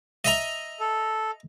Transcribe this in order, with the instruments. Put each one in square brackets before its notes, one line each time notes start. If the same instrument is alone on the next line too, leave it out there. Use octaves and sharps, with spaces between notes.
[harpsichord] D#5 E5 A#5
[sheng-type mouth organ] A4